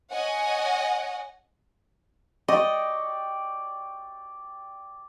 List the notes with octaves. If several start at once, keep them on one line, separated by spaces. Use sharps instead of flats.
C#5 D#5 F#5 G#5
D5 D#5 G5 C#6